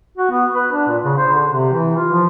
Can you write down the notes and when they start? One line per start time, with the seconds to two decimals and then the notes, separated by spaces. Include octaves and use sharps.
0.17 F#4
0.31 B3
0.55 B4
0.72 D4
0.88 A#2
1.04 C#3
1.18 C5
1.33 D3
1.49 C3
1.73 E3
1.96 F4
2.13 F3